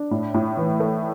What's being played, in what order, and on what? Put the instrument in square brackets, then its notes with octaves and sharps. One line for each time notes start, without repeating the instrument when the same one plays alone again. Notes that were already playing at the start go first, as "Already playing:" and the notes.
Already playing: [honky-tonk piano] D4
A2
A2
E3
A3